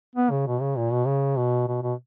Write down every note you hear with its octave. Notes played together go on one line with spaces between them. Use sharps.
B3
C#3
B2
C#3
A#2
B2
C#3
B2
B2
B2